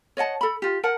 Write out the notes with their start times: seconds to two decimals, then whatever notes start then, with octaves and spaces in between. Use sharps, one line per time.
0.17 C#5 D#5 F#5 A5
0.41 A4 B5
0.62 F4 G4
0.83 A#4 F#5 A5